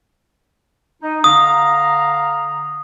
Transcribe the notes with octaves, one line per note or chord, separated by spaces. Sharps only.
D#4
D3 F5 A#5 D#6